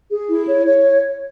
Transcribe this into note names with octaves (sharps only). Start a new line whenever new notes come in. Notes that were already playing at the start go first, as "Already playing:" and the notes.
G#4
E4
C#5
C#5